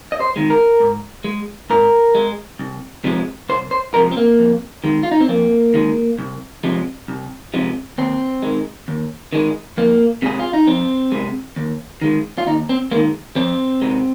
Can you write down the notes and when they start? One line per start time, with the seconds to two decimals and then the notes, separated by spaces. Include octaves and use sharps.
0.12 D#5
0.20 C5
0.36 D#3 G#3
0.50 A#4
0.80 G#2
1.24 G#3
1.70 G#2 A#4
2.15 G#3
2.59 C2
3.04 C3 F3 G#3
3.49 C2 C5
3.71 C5
3.94 C3 F3 G#3 A#4
4.11 C4
4.17 A#3
4.39 F2
4.84 D#3 G#3
5.03 F4
5.11 D#4
5.20 C4
5.28 F2 A#3
5.74 D#3 G#3
6.19 C2
6.64 C3 F3 G#3
7.08 C2
7.54 C3 F3 G#3
7.98 D#2 C4
8.42 D#3 G#3
8.88 D#2
9.33 D#3 G#3
9.77 F2 A#3
10.22 C3 G#3 G#4
10.39 F4
10.53 D#4
10.67 F2 C4
11.12 C3 G#3
11.56 D#2
12.02 D#3 G#3
12.38 F4
12.47 D#2 D#4
12.69 C4
12.91 G#3 A#3
12.95 D#3
13.36 F2 C4
13.82 C3 G#3